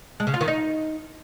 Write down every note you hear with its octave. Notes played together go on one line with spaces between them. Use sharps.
G#3
C#3
F4
D#3
D#4